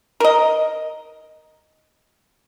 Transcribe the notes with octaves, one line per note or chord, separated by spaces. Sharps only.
A#4 D#5